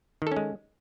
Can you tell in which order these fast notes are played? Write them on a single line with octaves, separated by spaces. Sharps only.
D#3 A4 C#4 G#3